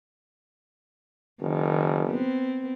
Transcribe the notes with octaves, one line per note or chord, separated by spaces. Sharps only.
F#1 D#3
B3 C4